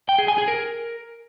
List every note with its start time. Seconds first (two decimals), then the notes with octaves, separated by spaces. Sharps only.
0.09 G5
0.18 G#4
0.28 G#5
0.38 G#4
0.48 A#4